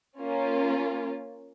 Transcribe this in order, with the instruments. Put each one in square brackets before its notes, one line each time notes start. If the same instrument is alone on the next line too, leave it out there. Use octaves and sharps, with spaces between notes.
[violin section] A#3 C#4 F4